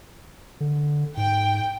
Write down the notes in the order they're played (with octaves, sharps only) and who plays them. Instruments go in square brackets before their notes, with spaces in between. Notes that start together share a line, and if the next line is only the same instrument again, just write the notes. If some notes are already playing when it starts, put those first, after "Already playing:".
[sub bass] D3
[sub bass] G#2 [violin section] G5